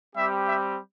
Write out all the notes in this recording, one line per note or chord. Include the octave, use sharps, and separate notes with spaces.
G3 C4 G4 E5
E5